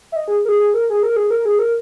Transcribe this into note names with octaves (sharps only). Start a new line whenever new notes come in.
E5
D#5
G#4
A#4
G#4
G#4
A#4
G#4
A#4
G#4
A#4
G#4
A#4